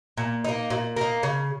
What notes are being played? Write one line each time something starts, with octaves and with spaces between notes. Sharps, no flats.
A#2
A#3 D#4
A#2
A#3 D#4
C#3